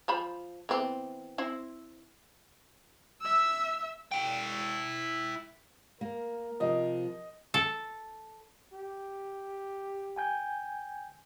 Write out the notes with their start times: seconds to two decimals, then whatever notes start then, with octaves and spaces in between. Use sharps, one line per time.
0.08 F3 C5 B5
0.69 E3 B3 C4
1.38 C4 E4 C5
3.21 E5 E6
4.11 E4 G5
6.01 A#3 A#4
6.60 C3 F3 D#5
7.54 A4
8.73 G4
10.16 G5 G#5 G6